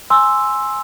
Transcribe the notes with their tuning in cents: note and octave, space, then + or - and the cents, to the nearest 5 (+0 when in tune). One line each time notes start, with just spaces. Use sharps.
G#5 +0 C6 +5 E6 +0